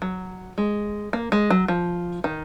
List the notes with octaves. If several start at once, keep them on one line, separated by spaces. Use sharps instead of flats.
F#3
G#3
A#3
G#3
F#3
F3
D#3